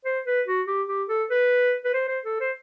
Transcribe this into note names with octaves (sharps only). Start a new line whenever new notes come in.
C5
B4
F#4
G4
G4
A4
B4
B4
C5
C5
A4
C5